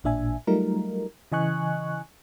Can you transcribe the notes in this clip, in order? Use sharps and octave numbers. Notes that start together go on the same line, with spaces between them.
A1 A#2 D4 E5 G#5
F#3 G3 A3 D#4 F4 A#4
C#3 E3 D#5 G#5 C#6 F#6